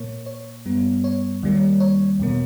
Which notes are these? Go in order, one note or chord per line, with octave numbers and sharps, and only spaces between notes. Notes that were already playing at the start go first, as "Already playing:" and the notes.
Already playing: A#2 A#3 C#5
C#5
G2 G3 B3
C#5
D#2 D#3 G3 A#3
C#5
E2 B2 A#3